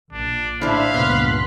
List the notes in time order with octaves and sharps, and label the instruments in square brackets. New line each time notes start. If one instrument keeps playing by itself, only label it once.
[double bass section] A#1 [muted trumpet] D4
[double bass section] A2 [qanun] D4 E4 [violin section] C5 E5 B5 [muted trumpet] F5
[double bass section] C#2 G2 A#2 [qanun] B3 [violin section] C6 F#6 B6